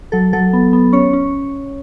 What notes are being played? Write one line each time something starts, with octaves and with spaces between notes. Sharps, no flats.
F#3 A4
F#3 A4
B3
B3
C#4 C#5
C#4